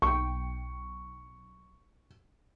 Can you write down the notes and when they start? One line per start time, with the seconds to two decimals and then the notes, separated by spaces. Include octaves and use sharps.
0.02 B1 G5 C#6